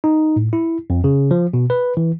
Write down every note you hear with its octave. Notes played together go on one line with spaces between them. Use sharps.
D#4
A2
E4
F2
C#3
F3
B2
B4
E3